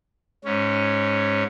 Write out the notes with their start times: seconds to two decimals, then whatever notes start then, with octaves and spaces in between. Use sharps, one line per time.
0.45 G#2 C#4